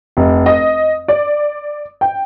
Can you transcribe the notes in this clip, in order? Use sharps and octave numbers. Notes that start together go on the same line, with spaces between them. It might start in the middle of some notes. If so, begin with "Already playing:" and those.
F1
D#5
D5
G5